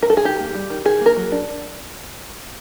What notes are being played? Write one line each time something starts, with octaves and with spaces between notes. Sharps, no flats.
A#4
A4
G#4
D#3 G4
A#3
G3
D#3
D#3 G#4
A#3
A#4
F#3
D4